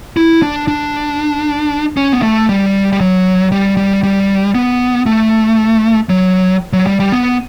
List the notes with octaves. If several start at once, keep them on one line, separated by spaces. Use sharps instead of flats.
E4
D4
D4
C#4
B3
A3
G3
G3
F#3
G3
G3
G3
B3
A3
F#3
F#3
G3
G3
B3